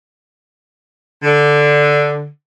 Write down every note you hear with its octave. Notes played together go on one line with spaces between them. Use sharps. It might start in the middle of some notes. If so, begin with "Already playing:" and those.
D3